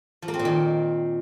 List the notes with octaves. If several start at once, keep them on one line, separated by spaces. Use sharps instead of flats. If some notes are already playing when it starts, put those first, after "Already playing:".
F3
A#3
C4
A#2
D#3